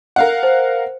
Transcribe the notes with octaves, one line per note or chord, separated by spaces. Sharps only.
A#4 F5 F#5
C5